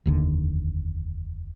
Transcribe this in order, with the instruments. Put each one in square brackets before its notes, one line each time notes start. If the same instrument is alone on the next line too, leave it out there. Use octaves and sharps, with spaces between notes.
[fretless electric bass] F1 D#2 D3